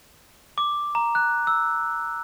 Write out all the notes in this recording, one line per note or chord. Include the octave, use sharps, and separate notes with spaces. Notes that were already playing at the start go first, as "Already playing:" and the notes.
D6
A#5
F#6
E6